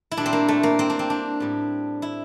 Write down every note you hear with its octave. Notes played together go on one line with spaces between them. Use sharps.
E4
A#2 G3 D4
C4
A#3
A3
A#3
C4
D4
C4
D4
A2 G3
E4